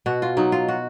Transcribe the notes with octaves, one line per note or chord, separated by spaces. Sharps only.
B2 F#4
F4
F#3 D#4
F4
F#4